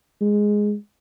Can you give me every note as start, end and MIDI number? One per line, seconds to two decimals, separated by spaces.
0.21 0.75 56